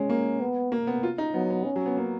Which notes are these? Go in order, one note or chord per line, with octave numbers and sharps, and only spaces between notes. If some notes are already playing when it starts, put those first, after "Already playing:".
Already playing: G#3 C#4
A#3
B3
A#3
B3
F4
D#4
F#3 B3
B3
C#4
F#3
B3
A#3